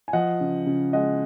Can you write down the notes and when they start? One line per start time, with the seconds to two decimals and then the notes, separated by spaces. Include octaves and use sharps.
0.08 G#5
0.13 F3 D#5 F#5
0.41 C#3
0.66 C#3
0.93 G#3 D#5 F#5